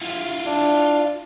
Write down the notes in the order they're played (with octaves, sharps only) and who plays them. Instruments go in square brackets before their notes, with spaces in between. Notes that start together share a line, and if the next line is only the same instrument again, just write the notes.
[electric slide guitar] E4 F4
[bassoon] D4